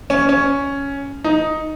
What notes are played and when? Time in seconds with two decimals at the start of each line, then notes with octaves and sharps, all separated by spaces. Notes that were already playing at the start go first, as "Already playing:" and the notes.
0.10 C#4
0.29 C#4
1.24 D#4